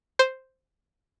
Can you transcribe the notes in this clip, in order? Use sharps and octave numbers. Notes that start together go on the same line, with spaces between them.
C5